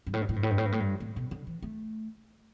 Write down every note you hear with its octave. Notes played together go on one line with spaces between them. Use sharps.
G2
A2
G2
A2
G2
A2
G2
A2
G2
A2
G2
A2
B2
D3
E3
A3